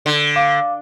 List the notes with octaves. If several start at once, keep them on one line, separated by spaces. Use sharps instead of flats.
D3
F5 D6